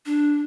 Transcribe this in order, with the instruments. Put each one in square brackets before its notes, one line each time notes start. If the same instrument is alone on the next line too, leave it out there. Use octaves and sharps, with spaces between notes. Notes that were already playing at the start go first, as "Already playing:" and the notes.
[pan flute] D4